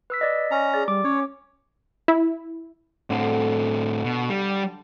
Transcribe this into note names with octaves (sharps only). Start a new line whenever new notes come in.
B4 E6 B6
D5 D#5
C#4 A#5
G#4 D5
G3 D6
C#4 C#5
E4
A2 D3 C4
B2
G3